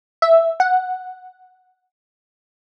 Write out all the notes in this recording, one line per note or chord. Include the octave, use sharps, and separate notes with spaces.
E5
F#5